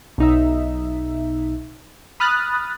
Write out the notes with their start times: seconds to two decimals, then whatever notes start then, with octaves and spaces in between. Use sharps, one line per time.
0.18 B1 D#4 E5
2.20 B5 D#6 F6 F#6 A6